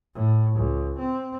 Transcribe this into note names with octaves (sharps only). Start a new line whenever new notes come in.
A2
C#2
C4